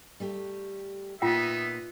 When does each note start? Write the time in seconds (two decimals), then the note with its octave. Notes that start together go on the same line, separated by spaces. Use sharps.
0.20 G3 A3 G4
1.22 A#2 B3 D#4 F4 E5 G5